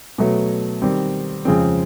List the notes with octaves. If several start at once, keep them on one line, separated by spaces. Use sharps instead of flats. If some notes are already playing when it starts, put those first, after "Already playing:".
B2 F#3 A3
D#3 G3 C4
F2 C#3 F3 G#3 C4